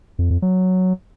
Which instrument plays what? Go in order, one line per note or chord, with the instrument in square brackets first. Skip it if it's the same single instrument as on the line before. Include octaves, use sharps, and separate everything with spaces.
[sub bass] F2
F2
F#3